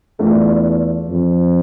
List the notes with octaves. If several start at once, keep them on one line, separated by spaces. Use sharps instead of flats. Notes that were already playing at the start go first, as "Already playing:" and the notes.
E2 A3 D4 F4 A4 D5
F2